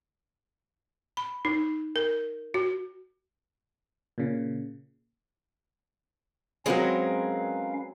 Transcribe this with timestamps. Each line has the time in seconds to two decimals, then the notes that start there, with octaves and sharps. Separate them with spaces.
1.17 B5
1.45 D#4
1.96 A#4
2.54 F#4
4.18 A#2 C#3
6.66 F#3 G#3 C4 C#4 A#4 B4 F5 A#5